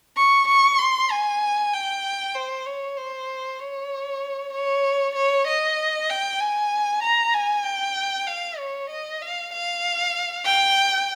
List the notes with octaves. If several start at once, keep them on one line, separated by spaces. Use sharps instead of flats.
C#6
C#6
C6
G#5
G5
C5
C#5
C5
C#5
C#5
C#5
D#5
G5
G#5
A#5
G#5
G5
F5
C#5
D#5
F5
F5
G5